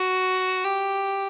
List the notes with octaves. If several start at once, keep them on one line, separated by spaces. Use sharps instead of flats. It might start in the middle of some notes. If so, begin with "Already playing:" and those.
Already playing: F#4
G4